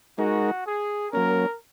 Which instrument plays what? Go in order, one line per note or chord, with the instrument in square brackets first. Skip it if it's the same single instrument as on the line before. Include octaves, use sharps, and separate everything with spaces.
[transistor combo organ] G#3 D#4 A#4 [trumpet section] F#4
[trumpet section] G#4
[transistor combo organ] F#3 A#3 C#4 [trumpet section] A#4